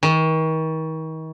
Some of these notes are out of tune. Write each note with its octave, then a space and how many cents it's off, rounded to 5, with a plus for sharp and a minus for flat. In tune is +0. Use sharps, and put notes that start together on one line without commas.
D#3 +40